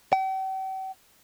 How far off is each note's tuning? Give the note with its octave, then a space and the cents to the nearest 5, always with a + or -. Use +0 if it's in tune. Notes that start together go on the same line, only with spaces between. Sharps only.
G5 -45